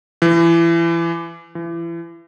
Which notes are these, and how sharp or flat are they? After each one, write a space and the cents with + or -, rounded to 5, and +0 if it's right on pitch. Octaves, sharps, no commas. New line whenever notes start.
E3 +30
E3 +35